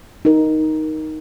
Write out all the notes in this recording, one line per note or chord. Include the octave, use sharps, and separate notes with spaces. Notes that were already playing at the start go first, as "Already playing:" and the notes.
D#4 A#4